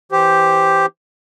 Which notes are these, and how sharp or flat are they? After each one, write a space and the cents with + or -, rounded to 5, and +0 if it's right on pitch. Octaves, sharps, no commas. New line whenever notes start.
E3 +0 G4 +0 C5 +0